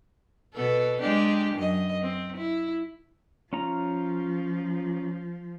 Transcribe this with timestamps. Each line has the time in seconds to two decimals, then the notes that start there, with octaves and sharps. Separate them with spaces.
0.54 B2 B3 A4
1.01 G#3 D4 G4
1.55 F#2 D#5
2.01 C4
2.36 E4
3.53 F3 C#4 F4 A#5